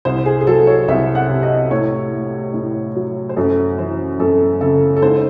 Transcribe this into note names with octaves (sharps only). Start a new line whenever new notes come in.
C2 C5
G#4
G#4
F#3 A4
C#5
C2 E5
F#5
C3
D#5
A2 C#5
A3
A2
F#3
C5
F#2 A4
E3 C5
F#2 A4
C#3 A4
A4
G#2 C5